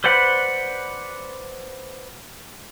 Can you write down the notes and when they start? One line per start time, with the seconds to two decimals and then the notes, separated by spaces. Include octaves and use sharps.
0.04 B4 C5 D5 F#5 B5